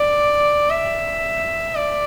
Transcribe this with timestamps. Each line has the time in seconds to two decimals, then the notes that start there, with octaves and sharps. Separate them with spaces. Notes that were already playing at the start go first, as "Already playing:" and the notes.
Already playing: D5
0.70 E5
1.76 D5